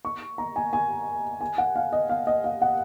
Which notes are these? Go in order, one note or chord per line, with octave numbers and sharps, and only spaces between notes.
C#6
A#5
G#5
G#5
G#5
F#5
F5
D#5
F5
D#5
F5
F#5